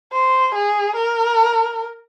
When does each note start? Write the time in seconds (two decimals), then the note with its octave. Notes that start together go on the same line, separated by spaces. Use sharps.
0.13 C5
0.55 G#4
0.96 A#4